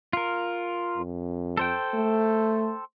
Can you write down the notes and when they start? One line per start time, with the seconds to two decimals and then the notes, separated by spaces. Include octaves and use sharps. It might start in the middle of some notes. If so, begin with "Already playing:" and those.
0.13 F4 A#4
0.97 F2
1.57 A4 C5 G5
1.94 A3